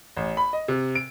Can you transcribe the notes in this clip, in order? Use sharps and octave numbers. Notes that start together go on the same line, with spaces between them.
A1
B5
D#5
C3
D7